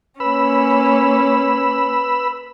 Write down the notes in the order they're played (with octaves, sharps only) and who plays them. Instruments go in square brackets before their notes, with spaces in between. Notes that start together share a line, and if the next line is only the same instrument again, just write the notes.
[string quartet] A#3 C#4 [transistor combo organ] B4 B5 E6